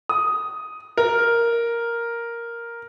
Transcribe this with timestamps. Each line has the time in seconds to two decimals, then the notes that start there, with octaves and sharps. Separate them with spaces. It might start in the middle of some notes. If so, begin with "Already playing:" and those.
0.09 D#6
0.97 A#4